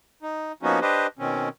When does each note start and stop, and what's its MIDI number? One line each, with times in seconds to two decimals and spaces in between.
0.23 0.52 63
0.63 0.80 53
0.63 0.80 58
0.63 0.80 59
0.63 0.80 61
0.63 0.80 63
0.63 0.80 66
0.82 1.07 62
0.82 1.07 67
0.82 1.07 71
0.82 1.07 72
0.82 1.07 75
1.19 1.49 47
1.19 1.49 51
1.19 1.49 60
1.19 1.49 61